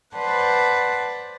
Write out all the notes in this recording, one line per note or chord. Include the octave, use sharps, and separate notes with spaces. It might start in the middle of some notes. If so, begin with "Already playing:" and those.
B4 C5 D5 F#5 A5